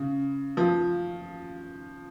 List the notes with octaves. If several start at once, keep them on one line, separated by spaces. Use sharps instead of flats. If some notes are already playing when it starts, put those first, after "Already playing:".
Already playing: C#3
F3